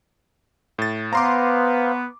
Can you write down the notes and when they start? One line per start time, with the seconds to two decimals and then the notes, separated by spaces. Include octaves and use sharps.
0.78 A2 A6
1.13 B3 B4 C5 F5 A#5 C6 D6